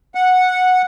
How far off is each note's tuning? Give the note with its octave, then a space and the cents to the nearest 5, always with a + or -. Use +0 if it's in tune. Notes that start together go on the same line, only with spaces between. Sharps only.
F#5 -10